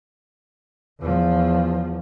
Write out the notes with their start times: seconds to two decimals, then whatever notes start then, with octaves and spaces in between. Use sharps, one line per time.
1.01 E2 F3